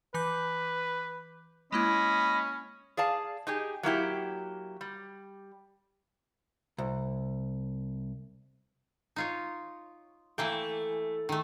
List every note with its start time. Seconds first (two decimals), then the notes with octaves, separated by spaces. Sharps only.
0.14 E3 B4 D6 G6
1.72 G#3 A#3 C#4 E4 D#5 B5
2.97 G#4 D5 F5 A5
3.47 D#4 G4 G#4
3.83 F#3 A#3 E4 G4
4.81 G3
6.78 C2
9.16 D#4 F4 C#5
10.38 E3 A3 A#3 G5
11.29 D#3 A3